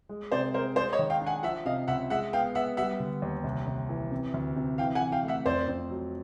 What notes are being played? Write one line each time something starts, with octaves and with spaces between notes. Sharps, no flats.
G#3
C3 C5 D5
G#3 A#4 C5
G#3 C5 D5
C#5 D#5
D#3
F5 G5
D4
F#5 G#5
F3 E5 F#5
C3 D#5 F5
C#2 E5 F#5
G#3 E5 F#5
B3 F5 G5
B3 E5 F#5
G3 E5 F#5
D3
D#2
C2
C2
E3
C3
D2
C3
E3 F5 G5
F#5 G#5
E3
F5 G5
A3
E5 F#5
F2 C5 D5
F2
F#3